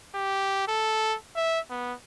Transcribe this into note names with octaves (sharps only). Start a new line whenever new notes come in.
G4
A4
E5
B3